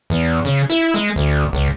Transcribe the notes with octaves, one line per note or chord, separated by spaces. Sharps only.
E2
C#3
E4
G#3
D2
C#2